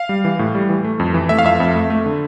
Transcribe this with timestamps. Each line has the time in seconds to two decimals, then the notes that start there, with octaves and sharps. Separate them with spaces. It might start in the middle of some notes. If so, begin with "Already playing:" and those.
Already playing: F5
0.09 G3
0.25 E3
0.39 A2
0.55 G3
0.69 E3
0.84 A3
1.00 F2
1.14 E3
1.29 A3 E5
1.39 F5
1.44 F2 E5
1.60 F2
1.75 A3
1.90 A3
2.06 D3